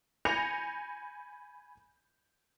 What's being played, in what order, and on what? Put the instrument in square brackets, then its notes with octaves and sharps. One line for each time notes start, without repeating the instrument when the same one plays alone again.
[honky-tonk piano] G#5 B5 G6 A#6 C#7 F7